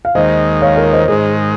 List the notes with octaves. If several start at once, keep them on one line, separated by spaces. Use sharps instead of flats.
F5
D#2 D#3 G#3 C5 D#5
C#5 F5
A#4 C#5
C5 D#5
G#2 D#3 G#3 G#4 C5